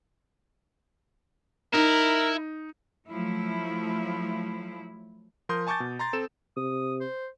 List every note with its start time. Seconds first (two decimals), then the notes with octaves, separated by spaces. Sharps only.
1.74 D#4 E4 A#4
3.09 F3 F#3 A3 E4
5.49 F3 A#4 C6 D#6 G6
5.67 G#5 A5 C#6 D6 G6 A6
5.80 B2
5.99 A#5 C6 A6
6.13 C4 A4 E7
6.57 C3 D#6
7.00 C5